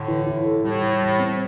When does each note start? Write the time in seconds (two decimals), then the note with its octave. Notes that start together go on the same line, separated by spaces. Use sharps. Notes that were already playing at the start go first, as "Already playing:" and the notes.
Already playing: A2 D3
0.08 E3
0.27 E4
0.45 A4
0.64 A2 G3
0.82 E3
1.00 G3
1.19 C4